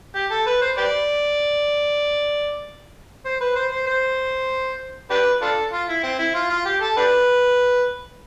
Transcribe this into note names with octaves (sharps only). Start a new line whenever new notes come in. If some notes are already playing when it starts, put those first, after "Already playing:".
G4
A4
B4
C5
G4 B4 D5
C5
B4
C5
C5
C5
D4 G4 B4
D4 F4 A4
F4
E4
C4
E4
F4
F4
G4
A4
D4 G4 B4